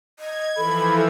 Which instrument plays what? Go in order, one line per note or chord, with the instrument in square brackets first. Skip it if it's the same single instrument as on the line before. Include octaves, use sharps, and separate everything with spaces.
[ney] D#5 [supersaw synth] G#6
[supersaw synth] E3 F3 [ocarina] A4 [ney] B5